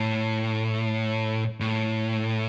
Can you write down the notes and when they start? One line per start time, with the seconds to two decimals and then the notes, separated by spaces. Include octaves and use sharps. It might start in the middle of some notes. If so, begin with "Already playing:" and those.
Already playing: A2
1.60 A2